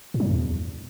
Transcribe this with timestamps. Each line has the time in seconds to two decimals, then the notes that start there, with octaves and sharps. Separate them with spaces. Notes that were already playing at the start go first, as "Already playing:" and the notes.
0.14 A2
0.20 F#3
0.26 G2
0.31 E2